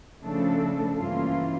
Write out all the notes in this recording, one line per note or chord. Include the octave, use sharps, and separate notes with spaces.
C#3 F3 A3 D4 A4
G2 E3 A#3 C#4 F4